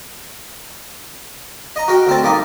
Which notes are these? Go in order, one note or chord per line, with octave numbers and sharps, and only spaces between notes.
D#5 A#5
F#4 A#4 G5
D2 C4 A5
G3 A#3 D#4